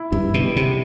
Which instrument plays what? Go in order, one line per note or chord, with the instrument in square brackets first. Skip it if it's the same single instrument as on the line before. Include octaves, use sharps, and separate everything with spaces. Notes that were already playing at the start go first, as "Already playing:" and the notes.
Already playing: [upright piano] E4
[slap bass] G2 [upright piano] E4
[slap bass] B2
[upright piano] G3
[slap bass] C3